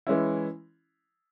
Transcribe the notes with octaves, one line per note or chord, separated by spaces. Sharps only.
E3 G#3 C#4 E4